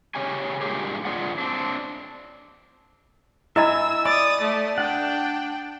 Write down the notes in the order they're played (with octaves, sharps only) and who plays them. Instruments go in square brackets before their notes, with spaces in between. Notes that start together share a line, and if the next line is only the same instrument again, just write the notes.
[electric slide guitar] C#3 C#4 G4 G#5
G2 A#2 G#3 G4 G#4
G#2 D3 F4 G#4 D5 F#5
C4 D4
[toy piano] E4 D#5 B5 [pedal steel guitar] E5 G#5 [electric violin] E6
[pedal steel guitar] D5 [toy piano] B5 [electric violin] D#6 A6
[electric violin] A3
[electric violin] D4 G5 [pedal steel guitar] F#5